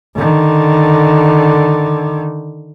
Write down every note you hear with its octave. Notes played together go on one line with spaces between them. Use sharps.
D3 D#3